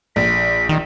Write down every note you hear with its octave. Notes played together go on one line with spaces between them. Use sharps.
A#1 B6
D#3